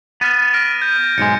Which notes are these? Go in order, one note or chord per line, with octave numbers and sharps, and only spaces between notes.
B3 F6 A6 D#7
F6 A#6 D7
G6
B1 G#2 G#3 C#7